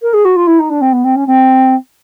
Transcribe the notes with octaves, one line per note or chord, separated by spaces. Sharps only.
A#4
G#4
F#4
F4
E4
D#4
D4
C4
B3
C4
C#4
C4